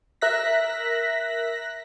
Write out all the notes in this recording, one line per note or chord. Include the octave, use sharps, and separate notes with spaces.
A#4 E5 F#6 A#6 B6